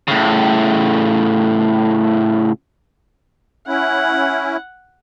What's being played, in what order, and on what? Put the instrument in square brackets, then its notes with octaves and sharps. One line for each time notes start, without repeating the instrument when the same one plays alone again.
[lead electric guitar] A2 C#3
[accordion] C#4 E4 [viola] F#5